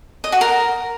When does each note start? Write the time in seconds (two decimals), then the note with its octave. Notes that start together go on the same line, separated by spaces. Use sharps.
0.24 D#5
0.32 F#4
0.41 A#4